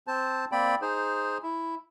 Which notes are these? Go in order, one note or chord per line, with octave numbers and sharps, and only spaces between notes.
C4 C5 A5
A#3 C4 D5 G5 B5
D#4 G#4 C5
E4